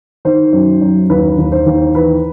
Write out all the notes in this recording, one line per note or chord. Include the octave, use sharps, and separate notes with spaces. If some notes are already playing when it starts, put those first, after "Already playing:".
D#3 C5
F#2
F#2
D#2 B4
D#2
C5
D#2
E3 B4